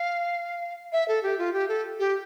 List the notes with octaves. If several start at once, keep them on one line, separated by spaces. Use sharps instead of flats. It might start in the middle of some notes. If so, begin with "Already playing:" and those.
Already playing: F5
E5
A4
G4
F4
G4
A4
G4